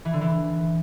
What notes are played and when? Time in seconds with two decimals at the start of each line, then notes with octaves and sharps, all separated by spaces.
0.05 E3
0.13 D3
0.21 E3